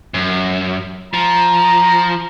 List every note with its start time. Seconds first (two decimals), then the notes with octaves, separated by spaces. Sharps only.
0.14 F#2
1.14 F3 A#5